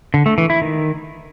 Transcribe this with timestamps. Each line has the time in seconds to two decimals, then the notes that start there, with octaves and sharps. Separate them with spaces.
0.14 D3
0.26 A3
0.38 E3
0.50 E4
0.62 D#3